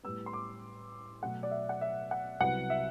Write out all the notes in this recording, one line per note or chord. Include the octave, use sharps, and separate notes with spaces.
A2 G3 B3 E6
C6
D6
B2 F#3 A3 F#5
D5
E5
F#5
E5
F#5
C2 C3 F#3 B3 F#5
E5